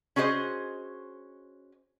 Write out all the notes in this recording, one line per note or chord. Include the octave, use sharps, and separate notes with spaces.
C#4 F#4 G#4 C5 D#5